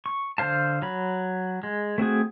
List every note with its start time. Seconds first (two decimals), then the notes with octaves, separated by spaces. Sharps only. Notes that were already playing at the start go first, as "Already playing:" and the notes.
0.06 C#6
0.38 D3 C5 F5 A5
0.82 F#3 B5
1.63 G#3
1.98 A3 C4 F#4 G#4